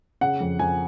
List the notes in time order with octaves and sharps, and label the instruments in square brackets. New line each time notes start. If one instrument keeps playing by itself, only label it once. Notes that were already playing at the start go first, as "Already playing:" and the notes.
[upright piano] C#3 F#5
F2
F2 G#5